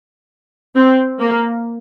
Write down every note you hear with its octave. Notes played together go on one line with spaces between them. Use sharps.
C4
A#3